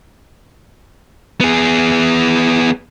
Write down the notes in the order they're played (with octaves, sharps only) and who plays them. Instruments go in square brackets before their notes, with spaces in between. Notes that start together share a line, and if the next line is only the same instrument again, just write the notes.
[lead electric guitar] B3 G#4